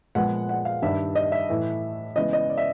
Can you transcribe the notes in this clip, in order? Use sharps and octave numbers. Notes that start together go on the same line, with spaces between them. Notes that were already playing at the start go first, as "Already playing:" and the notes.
A#2 F3 G#3 B3 F#5
F#5
F5
G2 D#3 G3 E5
D#5
E5
A2 E3 A3
C#3 E3 G#3 B3 D#5
D#5
D5
E5